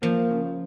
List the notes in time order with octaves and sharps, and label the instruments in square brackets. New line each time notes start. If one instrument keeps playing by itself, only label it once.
[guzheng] F3 [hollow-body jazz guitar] A#3
[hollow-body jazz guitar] C#3